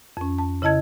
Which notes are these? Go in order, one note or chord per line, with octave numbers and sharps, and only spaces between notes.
F2 C#4
A5
C#3 E4 D#5 A5 G#6